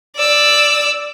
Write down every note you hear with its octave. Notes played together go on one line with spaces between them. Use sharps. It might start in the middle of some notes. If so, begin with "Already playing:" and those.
D5 E6